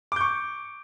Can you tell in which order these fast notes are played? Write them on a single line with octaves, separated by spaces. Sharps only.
D6 G6 C#6